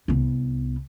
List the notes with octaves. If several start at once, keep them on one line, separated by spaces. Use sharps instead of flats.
C2 B3